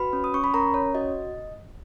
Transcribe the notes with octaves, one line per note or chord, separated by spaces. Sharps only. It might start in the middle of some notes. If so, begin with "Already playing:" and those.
Already playing: F#4 B4 B5
C#4
D#6
C#4 C#6
B5
C#4 A#4 A#5
C#4 C#5
F#4 D#5